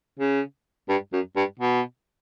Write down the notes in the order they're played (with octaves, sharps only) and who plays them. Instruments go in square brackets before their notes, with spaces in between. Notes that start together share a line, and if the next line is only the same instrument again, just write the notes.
[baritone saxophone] C#3
G2
F#2
G2
B2